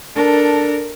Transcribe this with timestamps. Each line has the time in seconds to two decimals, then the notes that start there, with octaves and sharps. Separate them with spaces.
0.15 D4 A4 A#4